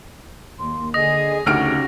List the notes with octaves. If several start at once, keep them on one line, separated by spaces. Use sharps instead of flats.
D#2 A#3 C6
D3 G#4 D#5 D#6 A#6
D2 C#3 D#4 F#4 G4 F6 D7